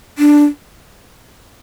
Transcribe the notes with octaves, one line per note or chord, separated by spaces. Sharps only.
D4